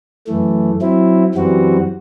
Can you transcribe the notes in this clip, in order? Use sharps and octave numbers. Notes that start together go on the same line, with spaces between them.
F#2 E3 A3
F#3 C4 E4
F#2 E3 G3 C4 F#4